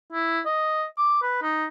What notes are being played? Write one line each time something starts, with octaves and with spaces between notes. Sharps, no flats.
E4
D#5
D6
B4
D#4